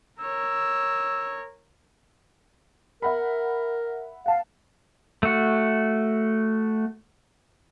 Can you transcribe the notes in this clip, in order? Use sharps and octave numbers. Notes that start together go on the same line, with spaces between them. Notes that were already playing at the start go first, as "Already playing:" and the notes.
A#4 C#5 E6
A#4 E5 F#5 B5
F5 F#5 A5
A3 F#4